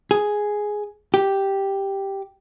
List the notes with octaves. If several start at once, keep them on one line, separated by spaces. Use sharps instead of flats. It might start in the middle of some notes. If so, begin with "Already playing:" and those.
G#4
G4